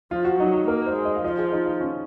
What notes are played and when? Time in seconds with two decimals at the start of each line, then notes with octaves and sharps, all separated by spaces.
0.11 F3 F4
0.25 F#4
0.39 F#3 D#4
0.54 F#4
0.68 A#3 A#4
0.86 C5
0.96 G#3
1.05 D#5
1.15 F5
1.23 F3 D#5
1.38 G#4
1.52 D#4
1.66 F4
1.80 C#4